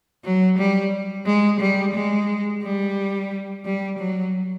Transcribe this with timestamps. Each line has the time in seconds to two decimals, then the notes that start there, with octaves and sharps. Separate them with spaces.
0.25 F#3
0.58 G3
1.26 G#3
1.60 G3
1.95 G#3
2.63 G3
3.65 G3
3.99 F#3